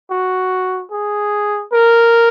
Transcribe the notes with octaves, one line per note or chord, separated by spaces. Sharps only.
F#4
G#4
A#4